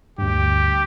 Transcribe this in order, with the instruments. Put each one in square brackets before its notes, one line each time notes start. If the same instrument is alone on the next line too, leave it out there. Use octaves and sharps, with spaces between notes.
[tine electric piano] D2 G2 [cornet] G4